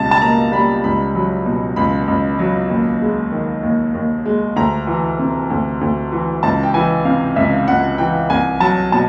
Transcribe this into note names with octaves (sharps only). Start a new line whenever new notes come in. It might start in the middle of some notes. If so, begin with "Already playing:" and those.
Already playing: C#2 B2 G3 A5
A5
A#3 A#5
G3 B5
C#2 B5
F#3
B2
C#2 B5
C#2
F#3
D#2
G#3
D#3
D#2
D#2
G#3
D2 A#5
E3
C3
D2
D2
E3
C#2 A5
G5
E3 G#5
C3 F5
C#2 E5
C#2 F#5
E3 G5
C2 G#5
F#3 A5
B2 A5